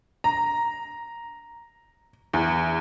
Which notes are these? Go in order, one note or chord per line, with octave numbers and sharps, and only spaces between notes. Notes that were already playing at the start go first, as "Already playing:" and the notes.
A#5
E2